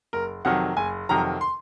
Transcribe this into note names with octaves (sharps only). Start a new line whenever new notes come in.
F#1 A#4
F2 C3 D#3 F#3 F#5
F#1 G#5
F2 C3 D#3 F#3 A#5
C6